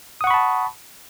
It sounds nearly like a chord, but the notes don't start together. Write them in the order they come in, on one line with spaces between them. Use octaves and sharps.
D#6 F#5 C#6 B5 A5